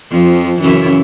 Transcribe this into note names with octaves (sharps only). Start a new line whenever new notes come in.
F2 F3
F#2 C#3 E3